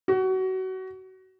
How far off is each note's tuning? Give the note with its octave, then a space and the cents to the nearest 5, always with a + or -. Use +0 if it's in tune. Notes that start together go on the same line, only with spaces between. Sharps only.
F#4 +25